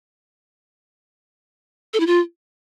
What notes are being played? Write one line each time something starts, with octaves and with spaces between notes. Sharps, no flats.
A4
E4
F4